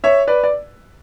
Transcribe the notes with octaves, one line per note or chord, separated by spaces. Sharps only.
C#5 E5
B4 D5
D5